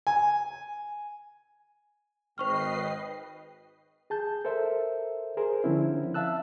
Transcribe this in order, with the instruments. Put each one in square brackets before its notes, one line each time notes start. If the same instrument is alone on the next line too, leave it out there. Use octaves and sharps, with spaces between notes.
[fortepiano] G#5
[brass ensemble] G#1 [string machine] B4 D#5 C7 [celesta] C5 C#6 F6 [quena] G5
[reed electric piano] G#4 A5 G6
A4 A#4 C5 E5
G#4 A#4 C5
D3 F3 C4 C#4 E4
E5 F5 A5 E6 F#6